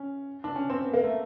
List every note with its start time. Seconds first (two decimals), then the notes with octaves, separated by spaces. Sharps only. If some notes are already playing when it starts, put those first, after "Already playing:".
Already playing: C#4
0.44 D4
0.55 C#4
0.70 C4
0.85 B3
0.94 A#3
1.03 A3